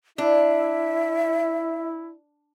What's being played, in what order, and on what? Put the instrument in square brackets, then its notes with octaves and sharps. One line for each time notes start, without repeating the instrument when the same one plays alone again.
[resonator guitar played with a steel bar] D4 [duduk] E4 [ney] E5